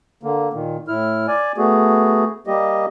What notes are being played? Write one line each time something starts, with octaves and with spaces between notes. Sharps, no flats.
D3 A#3
A#2 D#3
A2 E4 F6
D5 G#5
A3 B3 F#4 G#4
G3 A#3 G4 D#5